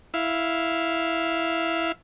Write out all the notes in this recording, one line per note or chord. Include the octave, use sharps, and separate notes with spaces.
E4 F5